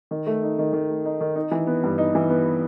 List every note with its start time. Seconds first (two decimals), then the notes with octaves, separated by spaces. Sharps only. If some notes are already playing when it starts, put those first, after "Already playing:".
0.11 D#3
0.27 A3
0.43 D#4
0.59 D#3
0.73 D#3
0.89 A3
1.05 D#4
1.21 D#3
1.36 D#4
1.51 E3
1.67 B3
1.83 G2
1.98 D#4
2.15 E3
2.30 B3